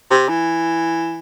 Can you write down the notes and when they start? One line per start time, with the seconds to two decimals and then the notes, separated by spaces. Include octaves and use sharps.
0.11 C3
0.29 E3